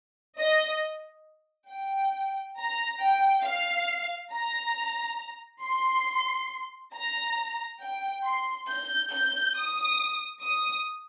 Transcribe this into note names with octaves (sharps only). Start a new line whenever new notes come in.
D#5
G5
A#5
G5
F5
A#5
C6
A#5
G5
C6
G6
G6
D#6
D#6